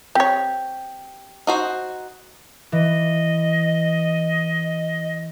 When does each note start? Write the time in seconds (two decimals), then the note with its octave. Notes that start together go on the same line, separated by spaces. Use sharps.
0.15 C4 G4 C#5
1.47 D#4 F#4 C5
2.72 E3 D#5